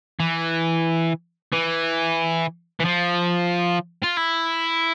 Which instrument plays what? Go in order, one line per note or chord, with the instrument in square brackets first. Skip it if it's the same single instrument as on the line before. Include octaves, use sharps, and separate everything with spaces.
[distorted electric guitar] E3
E3
E3
F3
F4
E4